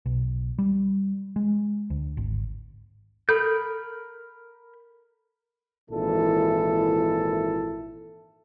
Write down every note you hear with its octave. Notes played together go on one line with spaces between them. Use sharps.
B1
G3
G#3
D2
G#1
A4 A#4 B5 G6
G#1 A#2 E3 E4 A4